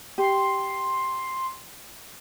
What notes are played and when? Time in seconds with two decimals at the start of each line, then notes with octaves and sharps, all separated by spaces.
0.18 G4 C6